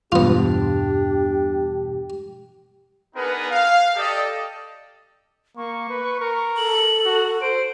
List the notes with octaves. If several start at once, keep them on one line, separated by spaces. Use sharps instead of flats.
E2 G2 B2 B3 D4 F4 G4
B3 D4 D#4 G#4 A#4 B4
F5
G4 A4 D5 D#5
A#3 C#6
B4
A#4
A4 F#7
F#4
C5 D7